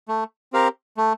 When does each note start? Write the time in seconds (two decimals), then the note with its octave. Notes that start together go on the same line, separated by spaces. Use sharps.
0.08 A3
0.53 C4 G4 A#4 F5
0.97 A3